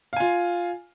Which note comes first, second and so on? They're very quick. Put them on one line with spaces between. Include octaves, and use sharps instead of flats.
F5 G#5 F4